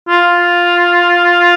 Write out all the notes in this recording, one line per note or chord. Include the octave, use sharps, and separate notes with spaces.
F4